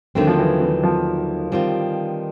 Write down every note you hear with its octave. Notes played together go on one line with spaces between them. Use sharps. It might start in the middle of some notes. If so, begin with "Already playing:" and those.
D#2 D3 D#3 F#3 A3 C4
F3
E3
E3
F3
D#3 G3 C4 F4